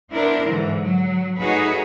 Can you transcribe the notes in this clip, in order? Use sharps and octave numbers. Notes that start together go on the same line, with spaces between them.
B3 D4 E4 A#4 C5
G#2 D3 E3
F#3
A3 D#4 F#4 G#4 B4 C#5